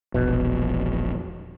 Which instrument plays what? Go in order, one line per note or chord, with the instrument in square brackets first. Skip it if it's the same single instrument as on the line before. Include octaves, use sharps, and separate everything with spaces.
[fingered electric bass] E1 A#1 [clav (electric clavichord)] B2